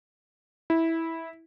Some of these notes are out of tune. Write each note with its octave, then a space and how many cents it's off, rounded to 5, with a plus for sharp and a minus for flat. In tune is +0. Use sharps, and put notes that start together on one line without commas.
E4 -10